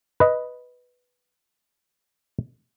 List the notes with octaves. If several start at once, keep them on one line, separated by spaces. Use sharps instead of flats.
B4 D#5